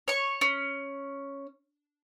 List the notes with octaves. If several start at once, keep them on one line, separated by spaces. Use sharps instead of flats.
C#5 C#6
C#4